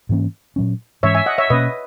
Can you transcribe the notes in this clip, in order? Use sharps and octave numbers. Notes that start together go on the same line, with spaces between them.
G#2 E3 A#3 C#4
A#2 F#3 C#4
G#2 E3 G#3 C#4 C#5 E5
E5 G#5
D#5 F#5
C#5 E5
B2 A#3 C#4 B4 D#5